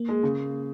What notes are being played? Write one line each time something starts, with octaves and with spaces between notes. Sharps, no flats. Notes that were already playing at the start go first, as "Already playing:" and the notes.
Already playing: A#3
G#3
C#3